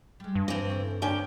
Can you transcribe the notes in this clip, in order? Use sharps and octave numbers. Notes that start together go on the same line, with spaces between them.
G3 G#3
G2
E3 F3 C4 F5
C#3 A4 C#5
D3 A3 C#4 D#4 G5